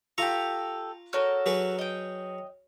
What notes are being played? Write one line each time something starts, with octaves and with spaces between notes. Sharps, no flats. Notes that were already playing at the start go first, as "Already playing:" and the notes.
F4 G4 A4 A#5 C#6
F#4 A4 A#4 C#5 F6
F#3 G#4 B4
D#5 G5